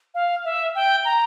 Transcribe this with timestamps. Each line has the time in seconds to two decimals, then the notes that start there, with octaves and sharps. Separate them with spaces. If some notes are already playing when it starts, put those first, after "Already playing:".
0.15 F5
0.45 E5
0.75 G5
1.05 A#5